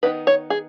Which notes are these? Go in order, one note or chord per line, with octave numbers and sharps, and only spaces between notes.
D#3 B3 D#4 B4
C#5
G#4